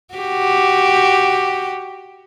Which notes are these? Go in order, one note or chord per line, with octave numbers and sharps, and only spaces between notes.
F#4 G4